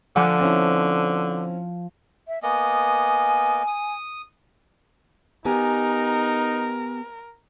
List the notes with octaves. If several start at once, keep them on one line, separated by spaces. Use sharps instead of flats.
D3 F3 F#5 G#5 D6
C4 C#4 E4
E5
A#3 B3 D#5 G#5
D#6
B3 D#4 G4 A#4 G#5